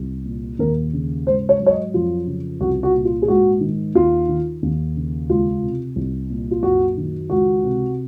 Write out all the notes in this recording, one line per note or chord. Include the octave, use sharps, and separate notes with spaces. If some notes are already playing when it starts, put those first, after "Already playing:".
Already playing: C2
A#2
D#2 A#4
C#3
G#2 C5
C#5
F#3
C#5
D#5
F2 F4
C#3
C2 F#4
F#4
A#2
F4
G#4
G#2 F#4
D#3
D#2 F4
D#3
D#2
C#3
C#2 F4
C3
C2
A#2
F4
F#2 F#4
D#3
C#2 F#4
C3